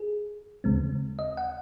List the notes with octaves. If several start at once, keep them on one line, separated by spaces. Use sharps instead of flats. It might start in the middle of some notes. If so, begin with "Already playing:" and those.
Already playing: G#4
D#2 C#3 G#3 C4
D#5
F#5